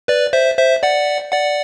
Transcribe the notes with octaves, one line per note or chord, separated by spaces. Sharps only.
B4 D5
C5 E5
C5 E5
D5 F#5
D5 F#5